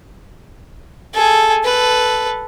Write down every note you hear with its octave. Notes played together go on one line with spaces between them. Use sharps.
G#4 A4
A4 B4